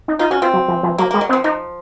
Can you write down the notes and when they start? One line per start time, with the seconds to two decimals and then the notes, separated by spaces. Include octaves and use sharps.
0.08 D#4
0.19 D#4 F4
0.30 C#4 F#4
0.42 C4 F4
0.54 F#3
0.68 F3
0.83 F3
0.98 F#3 A#3
1.11 G#3 A#3
1.21 F#3
1.29 C4
1.33 F3
1.44 F3 D#4